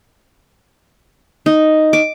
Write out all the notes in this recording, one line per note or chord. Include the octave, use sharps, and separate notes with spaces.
D#4
D6